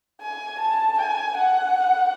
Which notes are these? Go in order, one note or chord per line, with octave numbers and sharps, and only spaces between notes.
G#5
A5
G#5
F#5